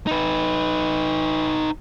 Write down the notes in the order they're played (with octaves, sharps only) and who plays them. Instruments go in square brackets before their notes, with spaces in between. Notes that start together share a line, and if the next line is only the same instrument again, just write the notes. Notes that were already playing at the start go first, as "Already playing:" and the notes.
[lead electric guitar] D#4 B4